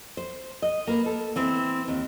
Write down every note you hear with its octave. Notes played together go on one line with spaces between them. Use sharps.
C5
D#5
A#3 B4
A4
E3 C4
D#2